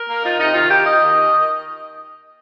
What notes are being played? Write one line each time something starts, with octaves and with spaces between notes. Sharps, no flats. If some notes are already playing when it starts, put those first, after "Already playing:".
Already playing: A#4
A#3
D#4 F4
C3 D#4
D#3 F4
A#3 G4
D#4 D#5
D#2
D#3